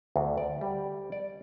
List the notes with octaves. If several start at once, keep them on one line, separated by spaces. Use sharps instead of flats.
D2
D5
G3
D5